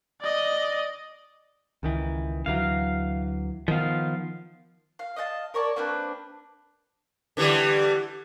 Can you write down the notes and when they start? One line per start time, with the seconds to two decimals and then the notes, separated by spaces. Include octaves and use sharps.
0.22 D5 D#5
1.83 C#2 D#3 E3
2.46 D2 E3 F#3 F5
3.68 D#3 F3 B3 F5
4.99 F5
5.16 D#5 F5 F#5 A5
5.54 A#4 C#5 D5 A5
5.76 A#3 C4 D4 B4
7.37 D3 E3 G3